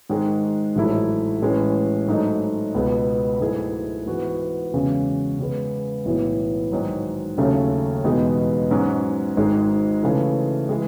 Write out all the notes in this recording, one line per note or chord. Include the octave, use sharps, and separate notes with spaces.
G#2 D#3 G#3
A1 G#2 F#3 A3 E4
A2 E3 G#3 C#4
G#2 F#3 A3 D#4
C#2 B2 G#3 B3
G#2 F#3 A3 E4 G#4
G#2 E3 B3 F#4
E2 C#3 G#3 C#4 F#4
C#3 G#3 B3
B1 A2 E3 B3 E4
G#2 D#3 F#3
D#2 C#3 F#3 A3 C#4
E2 B2 G#3 B3 D#4
G#2 F#3 C#4 F#4
G#1 G#2 D#3 G#3 D#4
C#3 E3 A3
E3 G#3